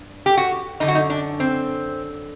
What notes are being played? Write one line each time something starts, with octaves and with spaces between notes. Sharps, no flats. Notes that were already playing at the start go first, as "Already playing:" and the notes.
Already playing: G2
G4
F#4
F#2 D3 D#4
F#4
D#4
D4
C4